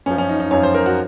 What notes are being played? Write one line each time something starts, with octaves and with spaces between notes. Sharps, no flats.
F#2 F3 C#4
C#4
D#4
D#4
F#2 F3 C#5
C5
A#4
F#4